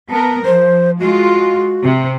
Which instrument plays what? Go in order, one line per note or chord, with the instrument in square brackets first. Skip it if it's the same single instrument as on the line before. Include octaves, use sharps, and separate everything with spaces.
[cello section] B3 A#4 [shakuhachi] A5
[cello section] F3 [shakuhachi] C5
[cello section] G#3 F4 [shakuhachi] F#4
[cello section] C3